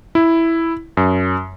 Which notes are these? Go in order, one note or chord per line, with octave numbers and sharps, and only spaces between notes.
E4
F#2